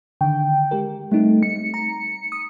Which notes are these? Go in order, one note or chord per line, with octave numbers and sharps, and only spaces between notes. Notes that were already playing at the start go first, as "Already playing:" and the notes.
D3 D#3 G5
G#3 G4 A#4
G3 A3 C4 D#4
C#7
A#5
D#6